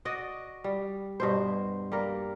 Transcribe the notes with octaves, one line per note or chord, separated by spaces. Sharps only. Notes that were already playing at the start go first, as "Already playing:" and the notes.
F#4 D5 D#5
G3
G2 B2 C5
G3 A#3 A#4